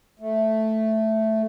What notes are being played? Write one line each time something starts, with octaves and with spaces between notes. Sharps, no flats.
A3